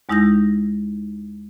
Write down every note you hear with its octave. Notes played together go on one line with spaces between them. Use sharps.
D#2 G#3 D#4 E4 G6 A#6